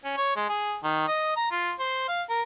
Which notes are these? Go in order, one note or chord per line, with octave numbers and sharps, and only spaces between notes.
C#4
C#5
G#3
G#4
D#3
D#5
A#5
F4
C5
F5
A#4